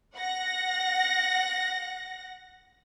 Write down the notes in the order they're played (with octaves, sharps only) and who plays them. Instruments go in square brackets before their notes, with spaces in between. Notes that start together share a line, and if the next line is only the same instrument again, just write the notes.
[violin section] F#5 A#6